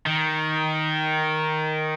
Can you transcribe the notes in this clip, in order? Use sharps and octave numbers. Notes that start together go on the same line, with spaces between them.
D#3